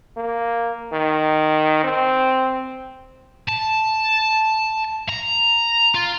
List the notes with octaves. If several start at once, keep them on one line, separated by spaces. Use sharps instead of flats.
A#3
D#3
C4
A5
A#5
F4